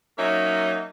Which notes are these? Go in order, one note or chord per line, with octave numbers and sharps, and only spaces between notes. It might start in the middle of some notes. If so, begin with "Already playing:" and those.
F#3 A#3 C#4 D#4 E5